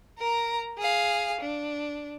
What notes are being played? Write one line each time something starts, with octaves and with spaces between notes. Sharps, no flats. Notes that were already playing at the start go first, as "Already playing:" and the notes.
A#4 A#5
G#4 F5
D4